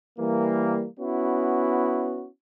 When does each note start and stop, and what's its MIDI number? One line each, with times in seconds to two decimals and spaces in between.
0.19 0.86 52
0.19 0.86 55
0.19 0.86 58
1.00 2.28 59
1.00 2.28 61
1.00 2.28 64
1.00 2.28 66